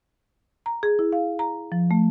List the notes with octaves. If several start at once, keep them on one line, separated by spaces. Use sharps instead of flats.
A#5
G#4
E4
F5
A#5
F3
A3